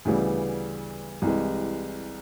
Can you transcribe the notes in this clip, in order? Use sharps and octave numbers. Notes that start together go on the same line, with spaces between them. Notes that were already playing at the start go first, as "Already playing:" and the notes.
D2 C#3 E3 G3 B3
C2 C3 E3 G#3